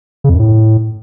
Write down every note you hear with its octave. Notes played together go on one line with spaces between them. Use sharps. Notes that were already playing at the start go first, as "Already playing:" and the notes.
C#3
F2
F#2
A2